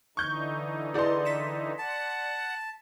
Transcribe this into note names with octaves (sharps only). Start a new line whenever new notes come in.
D3 E3 D#4 C#6 G6
E4 G#4 B4 D5 C6
B6 C#7 E7
F#5 A5